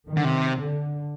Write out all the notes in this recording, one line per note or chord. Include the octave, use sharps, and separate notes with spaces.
D#3
D3
C3
D3